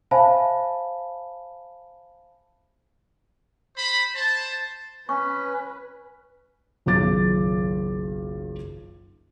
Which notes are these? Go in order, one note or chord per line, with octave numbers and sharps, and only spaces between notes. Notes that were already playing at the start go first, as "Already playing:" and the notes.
C5 E5 F5 G#5 A5 B5
C5 B5
C5 A5
C#4 B4 C#6
F#1 B1 D#3 F4 D6 A6